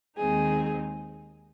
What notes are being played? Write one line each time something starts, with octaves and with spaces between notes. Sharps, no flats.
D#2 D#3 G#3 C4 D#4 G#4